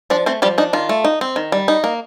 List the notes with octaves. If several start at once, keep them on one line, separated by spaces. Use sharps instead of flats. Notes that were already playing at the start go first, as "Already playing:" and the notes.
F3 D4 D5
A3 C4 C5
F3 G3 G4
D4 D#4
D#3 F4
A3
D#4
C4
D#3
G3
D#4
A#3